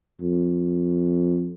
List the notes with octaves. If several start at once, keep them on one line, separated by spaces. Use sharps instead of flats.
F2